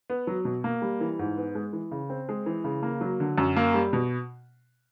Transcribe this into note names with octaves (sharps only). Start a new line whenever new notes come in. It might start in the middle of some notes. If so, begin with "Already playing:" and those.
B3
F#3
B2
A#3
G3
E3
G#2
B3
G#3
E3
C#3
C4
G#3
E3
C#3
A#3
F#3
D3
F#2
A#3
G3
B2